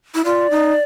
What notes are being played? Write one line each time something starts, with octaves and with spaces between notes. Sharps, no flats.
E4
F4 D5
D#4